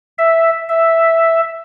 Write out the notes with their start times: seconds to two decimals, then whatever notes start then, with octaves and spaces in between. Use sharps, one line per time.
0.18 E5
0.69 E5